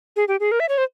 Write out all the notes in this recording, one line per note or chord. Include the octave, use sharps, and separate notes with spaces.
G#4
G4
G#4
A#4
E5
C#5
C5